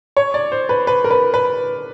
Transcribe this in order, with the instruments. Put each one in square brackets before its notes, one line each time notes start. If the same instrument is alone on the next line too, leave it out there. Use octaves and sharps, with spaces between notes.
[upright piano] C#5
D5
C5
B4
B4
A#4
B4
B4